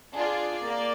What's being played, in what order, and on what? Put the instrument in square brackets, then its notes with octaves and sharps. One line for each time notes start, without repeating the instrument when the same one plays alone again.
[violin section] D4 F4 G#4 D5
A#3